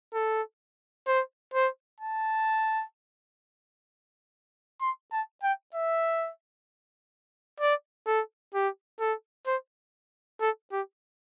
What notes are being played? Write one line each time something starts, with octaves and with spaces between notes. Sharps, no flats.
A4
C5
C5
A5
C6
A5
G5
E5
D5
A4
G4
A4
C5
A4
G4